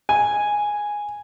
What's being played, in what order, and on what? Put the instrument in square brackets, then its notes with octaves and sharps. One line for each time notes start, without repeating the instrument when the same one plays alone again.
[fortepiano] G#5